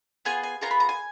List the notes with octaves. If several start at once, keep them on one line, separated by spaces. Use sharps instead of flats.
B3 F4 G#4 G#5
G#5
B3 F4 G#4 A#5
B5
A#5
G#5